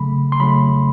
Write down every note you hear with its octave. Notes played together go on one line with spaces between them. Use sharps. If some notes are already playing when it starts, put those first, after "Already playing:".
Already playing: C#3 F#3 A3 B5
C6
C#3 F#3 A3 B5